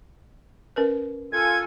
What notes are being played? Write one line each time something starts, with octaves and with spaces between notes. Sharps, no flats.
C#4 A#4 B4
F4 A4 G#5 G#6